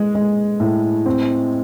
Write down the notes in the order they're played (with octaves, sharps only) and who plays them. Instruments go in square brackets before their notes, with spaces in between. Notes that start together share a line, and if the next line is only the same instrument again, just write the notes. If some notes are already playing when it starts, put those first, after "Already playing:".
Already playing: [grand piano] G#3
G#3
A2
C4